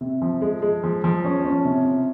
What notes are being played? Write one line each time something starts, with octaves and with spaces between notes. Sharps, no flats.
C3
F3
G#3
G#3
F3
F3
C#4
C#4
C3
C3